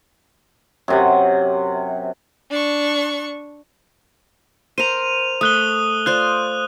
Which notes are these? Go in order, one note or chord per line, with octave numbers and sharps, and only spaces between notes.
F#2 C3 F#5
D4 C#6
A#4 C5 D#7 F7
A3 D#6 F#6 G7
F4 C5 D5 F#6